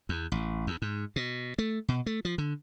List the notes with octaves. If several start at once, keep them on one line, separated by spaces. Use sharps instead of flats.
E2
A1
E2
G#2
B2
A3
B2
A3
F3
D3